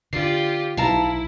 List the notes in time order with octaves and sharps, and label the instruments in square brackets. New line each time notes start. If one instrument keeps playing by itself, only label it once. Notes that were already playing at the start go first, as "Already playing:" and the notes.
[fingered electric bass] D3 [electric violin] F4 G4 [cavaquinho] D5 [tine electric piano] C7
[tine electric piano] B1 [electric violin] E4 [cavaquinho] F5 A5 A#5